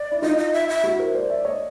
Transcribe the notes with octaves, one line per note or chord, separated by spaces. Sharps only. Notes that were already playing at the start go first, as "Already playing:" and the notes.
Already playing: D5
E4
D#4 F4 D#5
D#5
E5
E5
E4 F#4
A#4 C5
C5 D5
D5 E5
C#5 D#5